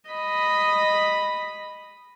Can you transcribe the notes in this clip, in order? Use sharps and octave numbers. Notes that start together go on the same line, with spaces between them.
D#5 B5